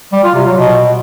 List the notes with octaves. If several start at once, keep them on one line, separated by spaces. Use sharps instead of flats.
G3
F4
C3
F#3
B2